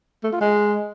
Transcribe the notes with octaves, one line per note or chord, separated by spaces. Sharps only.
A3
F4
G#3